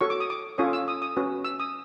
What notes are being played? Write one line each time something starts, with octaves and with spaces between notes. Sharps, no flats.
F#4 A4 C#5 C#6
D6
D#6
D6
C#4 F4 A4 C#5 D#6
E6
D#6
D#6
C#4 F#4 B4
E6
D#6